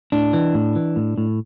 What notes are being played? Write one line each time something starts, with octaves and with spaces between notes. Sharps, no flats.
A2 D4
E3
A2
E3
A2
A2